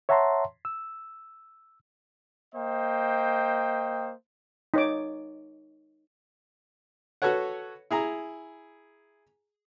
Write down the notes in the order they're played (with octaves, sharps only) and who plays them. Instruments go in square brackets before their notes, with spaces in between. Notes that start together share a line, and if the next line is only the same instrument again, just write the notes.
[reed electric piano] C#5 E5 F#5 A5 A#5 C6
E6
[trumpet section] A#3 C5 D#5 G5
[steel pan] D#4 C#5 D6
[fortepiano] F#4 A4 B4 C#5 F#5
E4 G#4 A#5